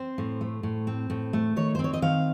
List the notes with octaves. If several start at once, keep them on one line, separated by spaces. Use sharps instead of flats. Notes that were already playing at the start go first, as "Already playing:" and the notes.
Already playing: C4 C5
A2
A3
A2
C4
A2
A3
D#3 C#5
C5
C4
C#5
D#5
D#3 F5